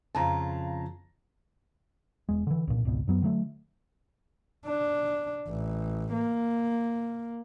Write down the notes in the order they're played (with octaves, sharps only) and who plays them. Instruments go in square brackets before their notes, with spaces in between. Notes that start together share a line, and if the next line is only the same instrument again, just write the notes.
[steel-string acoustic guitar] F2 C#3 F4 [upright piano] A5 A#5
[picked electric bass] E1 G#3
D3 E3
C2 A#2
G#1 C#2 B2
F#2 F#3 B3
D3 F#3 A3
[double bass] D4
A1
A#3